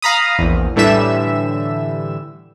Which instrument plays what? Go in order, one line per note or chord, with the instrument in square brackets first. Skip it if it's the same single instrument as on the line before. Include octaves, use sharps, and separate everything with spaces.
[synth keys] F5 A#5 B5 D#6
A#1 E2
A2 D3 E3 G3 E5 E7